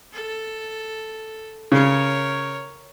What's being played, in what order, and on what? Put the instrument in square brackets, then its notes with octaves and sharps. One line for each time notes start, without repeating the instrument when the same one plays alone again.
[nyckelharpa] A4
[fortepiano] C#3 [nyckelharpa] A#4 C#5